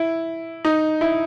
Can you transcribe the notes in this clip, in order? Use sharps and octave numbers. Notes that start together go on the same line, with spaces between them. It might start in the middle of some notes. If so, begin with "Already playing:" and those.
Already playing: E4
D#4
E4